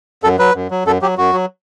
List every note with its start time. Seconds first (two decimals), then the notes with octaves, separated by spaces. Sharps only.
0.24 F#2 A4
0.38 F#3 B4
0.55 F#2
0.71 F#3
0.85 F#2 A4
1.02 F#3 G4
1.18 F#2 F#4
1.33 F#3